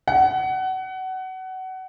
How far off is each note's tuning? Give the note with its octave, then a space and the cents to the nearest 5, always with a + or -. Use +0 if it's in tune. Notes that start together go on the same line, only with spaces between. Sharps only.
F#5 +25